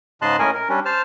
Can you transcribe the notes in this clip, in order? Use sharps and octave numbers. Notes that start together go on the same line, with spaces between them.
G#2 C#3 D#5 A5 C6 F#6
A2 C#4 A#4 D#5 G#5
A#4
G3 C#4 D4
C5 A5 F6